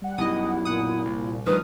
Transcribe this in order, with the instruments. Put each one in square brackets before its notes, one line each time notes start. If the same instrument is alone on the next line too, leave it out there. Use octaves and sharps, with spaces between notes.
[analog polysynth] G3 F#5
[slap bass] B1 F#2 [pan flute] E4 [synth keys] D#5 D#6
[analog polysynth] A#2 [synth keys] F#5 D#6
[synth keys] C2
[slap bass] D2 F3 [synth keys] D#3 G3 [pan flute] B4 [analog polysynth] D#6 F6